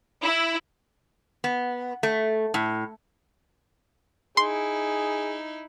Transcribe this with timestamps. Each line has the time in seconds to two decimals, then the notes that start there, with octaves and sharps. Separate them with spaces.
0.22 E4
1.44 B3
2.03 A3
2.54 A2
4.37 D#4 E4 G#4 C6